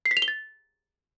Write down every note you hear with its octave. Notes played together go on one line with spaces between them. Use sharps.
C7
B6
F7
G7
A6